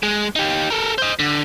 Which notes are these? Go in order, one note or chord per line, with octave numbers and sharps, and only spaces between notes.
G#3
D#4 G4
A4 A#4
C5 D#5
D3